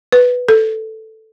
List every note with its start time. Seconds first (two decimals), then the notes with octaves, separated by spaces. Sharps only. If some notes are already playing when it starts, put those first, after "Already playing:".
0.12 B4
0.49 A4